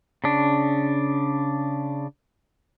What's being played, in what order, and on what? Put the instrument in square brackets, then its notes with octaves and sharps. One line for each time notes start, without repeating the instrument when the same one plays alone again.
[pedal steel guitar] C#3 D4